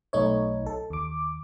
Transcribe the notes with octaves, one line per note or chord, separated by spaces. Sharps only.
B1 A3 D#4 C#5
A4
D#2 D6